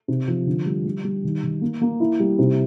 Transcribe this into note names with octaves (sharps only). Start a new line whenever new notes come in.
C3
F3
D3
G3
G3
G3
D#3
D#3
A#3
A#3
E4
G3
C3